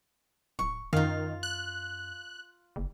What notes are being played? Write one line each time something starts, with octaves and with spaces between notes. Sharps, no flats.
D1 C#6
F#2 D#3 F4 F5
F#6
F#1